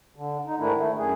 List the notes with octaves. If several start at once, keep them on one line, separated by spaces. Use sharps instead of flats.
D3
D#4
G#2 D#3 A3 D4 E4
A3
F#2 G#4